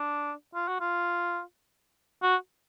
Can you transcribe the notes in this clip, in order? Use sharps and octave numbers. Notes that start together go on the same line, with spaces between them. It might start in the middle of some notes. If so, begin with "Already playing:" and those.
Already playing: D4
F4
F#4
F4
F#4